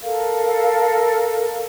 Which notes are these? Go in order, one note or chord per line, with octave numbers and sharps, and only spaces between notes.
A4 A#4 F5